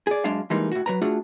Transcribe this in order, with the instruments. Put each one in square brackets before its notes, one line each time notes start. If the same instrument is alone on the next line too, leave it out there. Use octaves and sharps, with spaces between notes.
[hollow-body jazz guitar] G#4 D5
F#2 G#3 D4 F5
E3 G3 G#3 A#3 D#4
A2 F#4
F#3 B4 A#5
A3 D4 F4 F#4 G#4